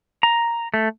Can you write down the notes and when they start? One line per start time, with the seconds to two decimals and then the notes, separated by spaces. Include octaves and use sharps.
0.23 A#5
0.74 A3